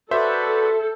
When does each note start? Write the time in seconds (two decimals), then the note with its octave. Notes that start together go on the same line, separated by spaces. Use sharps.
0.11 F#4 A4 B4 C5 D5 E5 G6